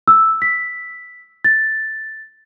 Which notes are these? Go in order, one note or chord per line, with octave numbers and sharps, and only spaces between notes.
E6
B6
A6